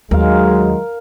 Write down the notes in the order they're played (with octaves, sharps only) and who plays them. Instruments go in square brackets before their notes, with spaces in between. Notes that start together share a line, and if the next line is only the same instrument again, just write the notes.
[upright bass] D#2 [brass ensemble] F#3 G#3 [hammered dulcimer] A#4 F5